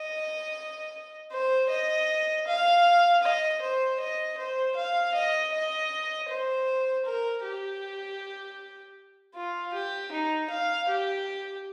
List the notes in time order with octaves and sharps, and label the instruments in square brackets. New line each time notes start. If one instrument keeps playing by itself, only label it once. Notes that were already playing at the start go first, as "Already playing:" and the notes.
Already playing: [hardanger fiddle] D#5
C5
D#5
F5
D#5
C5
D#5
C5
F5
D#5
D#5
C5
A#4
G4
F4
G4
D#4
F5
G4